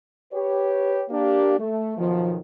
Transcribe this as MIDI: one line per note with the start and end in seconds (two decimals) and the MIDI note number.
0.33 1.04 67
0.33 1.04 71
0.33 1.04 73
1.10 1.57 58
1.10 1.57 62
1.10 1.57 67
1.59 1.97 57
1.97 2.36 35
1.97 2.36 47
1.97 2.36 51
1.97 2.36 53